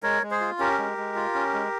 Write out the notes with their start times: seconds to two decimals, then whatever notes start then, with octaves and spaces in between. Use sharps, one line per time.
0.03 G#3 A#4 C#5
0.23 G#3
0.31 G#4 C5
0.41 F4
0.59 C#4 G4 A#4
0.78 G#3
0.97 G#3
1.15 F4
1.35 C#4
1.53 G#3